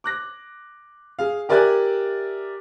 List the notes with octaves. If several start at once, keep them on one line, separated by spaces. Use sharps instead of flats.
D6 F#6 A#6
G#4 F5
G4 A#4 D5 E5 G#5 F#6